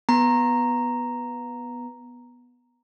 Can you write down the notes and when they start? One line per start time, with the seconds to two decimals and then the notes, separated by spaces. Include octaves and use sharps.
0.09 B3 A#5